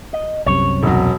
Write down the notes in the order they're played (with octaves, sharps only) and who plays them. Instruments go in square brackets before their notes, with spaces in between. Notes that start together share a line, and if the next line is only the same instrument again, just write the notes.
[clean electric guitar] D#5
[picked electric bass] C2 F#2 C3 [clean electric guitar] C#5
[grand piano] E1 F#3